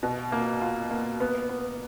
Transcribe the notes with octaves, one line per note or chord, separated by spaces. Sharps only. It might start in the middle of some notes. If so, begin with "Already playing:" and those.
B2
A#3
F4
A#3
B3
B3